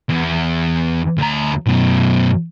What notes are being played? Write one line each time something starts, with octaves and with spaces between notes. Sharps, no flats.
E2
D2 A#5
F#2 B2